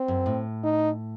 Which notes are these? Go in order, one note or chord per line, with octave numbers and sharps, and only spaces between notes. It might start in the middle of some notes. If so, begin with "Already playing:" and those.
Already playing: C4
F#2
A2
D#4